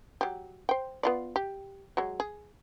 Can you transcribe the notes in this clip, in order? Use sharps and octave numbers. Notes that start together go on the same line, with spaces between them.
F#3 G4
C5 G5
B3 F4 D5
G4
F#3 G#3
G#4